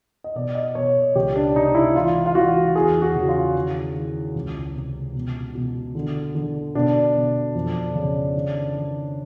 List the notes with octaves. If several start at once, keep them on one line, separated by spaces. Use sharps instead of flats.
D#5
B2 D5
D#5
B2 C#5
C#2 G4
D4
C3 D#4
E4
E3 F4
F4
E3 F#4
E2 G#4
F#4
C#3
F4
D#3
D#3
C#2
C3
B2
B2
D3
D3
B2 D4
B2
F2
C#3
D#3
D#3